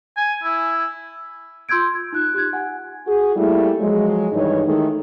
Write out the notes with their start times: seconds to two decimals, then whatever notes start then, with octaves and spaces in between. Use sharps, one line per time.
0.17 G#5
0.44 E4
1.69 F4 C6 E6 G6 G#6 D7
1.94 G#6
2.12 D#4 F4 F#6
2.34 G4 F#6 G#6
2.53 F#5 G#5
3.06 F#4 G#4
3.36 G3 A3 A#3 E4
3.79 F3 F#3 G#3
4.32 G2 D#3 E3 D#4 C#5
4.66 D#3 E3 G#3 A3 D#4